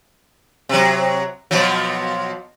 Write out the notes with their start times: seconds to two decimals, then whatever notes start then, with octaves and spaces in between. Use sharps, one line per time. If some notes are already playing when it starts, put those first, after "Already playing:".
0.69 C3 F#3
1.51 B2 F3 F#3